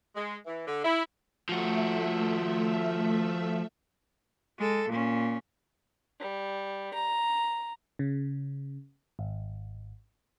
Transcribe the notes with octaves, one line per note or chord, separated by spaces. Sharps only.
G#3
E3
D3
E4
F3 A3 F#4 E5
G#3 A4
A#2 C#4
G3
A#5
C#3
G#1